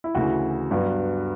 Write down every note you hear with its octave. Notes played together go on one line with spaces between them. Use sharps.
E4
D2 C#3 E3 F#4
G2 F#3 B3